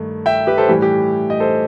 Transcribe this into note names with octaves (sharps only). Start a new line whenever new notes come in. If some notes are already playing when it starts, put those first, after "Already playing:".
Already playing: G2 D#3 A3
E5 G5
G4 B4
A4 C5
A2 E3 G3 G4
G4
D#5
A4 C5